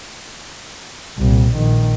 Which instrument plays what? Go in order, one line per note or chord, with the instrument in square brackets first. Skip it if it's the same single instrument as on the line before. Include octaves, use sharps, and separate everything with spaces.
[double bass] C2 A#2
A#1 D#3